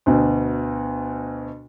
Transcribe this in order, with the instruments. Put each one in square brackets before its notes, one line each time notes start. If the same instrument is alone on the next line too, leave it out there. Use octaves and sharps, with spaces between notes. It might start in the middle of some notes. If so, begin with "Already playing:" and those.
[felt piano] D2 B2